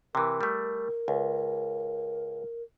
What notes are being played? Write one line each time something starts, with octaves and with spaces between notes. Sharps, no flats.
C3 E3 A#4
G3 A3
C#2